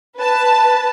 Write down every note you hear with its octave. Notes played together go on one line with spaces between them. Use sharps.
B4 A5